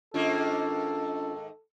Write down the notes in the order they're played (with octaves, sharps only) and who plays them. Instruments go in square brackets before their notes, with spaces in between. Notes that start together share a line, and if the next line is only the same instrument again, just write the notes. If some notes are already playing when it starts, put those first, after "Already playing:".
[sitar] G#2 D#3 A#3 [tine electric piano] C#4 D4 F4 [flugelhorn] A4